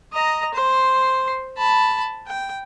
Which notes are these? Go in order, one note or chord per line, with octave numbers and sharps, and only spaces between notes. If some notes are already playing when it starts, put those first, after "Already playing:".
D#5 A#5
C5 C6
A5 B5
G5